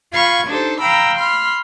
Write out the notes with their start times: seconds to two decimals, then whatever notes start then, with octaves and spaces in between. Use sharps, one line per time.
0.13 F4 F5 B5 C#6 G#6
0.48 D4 D#4 G4 A4 C5
0.80 F5 G5 A#5 B5 E6
1.17 B5 C6 F6